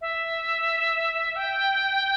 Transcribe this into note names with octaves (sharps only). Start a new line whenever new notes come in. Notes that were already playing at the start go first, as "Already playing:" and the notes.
E5
G5